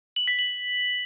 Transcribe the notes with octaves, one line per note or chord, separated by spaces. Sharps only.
F#7
B6
F#7